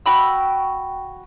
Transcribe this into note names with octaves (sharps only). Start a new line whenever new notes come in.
F#4 G5 B5 E6